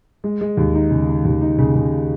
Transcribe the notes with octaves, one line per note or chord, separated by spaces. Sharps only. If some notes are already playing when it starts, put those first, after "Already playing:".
G#3
G#3
D#2
D#4
C#3
D#4
D#2
D#4
C#3
C#3